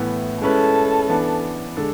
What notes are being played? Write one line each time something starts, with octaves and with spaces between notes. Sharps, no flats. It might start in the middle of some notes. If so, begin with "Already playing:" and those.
Already playing: A2 E3 B3
G#3 C#4 E4 A4 B4
E3 B3 D4
D3 G#3 D4 A4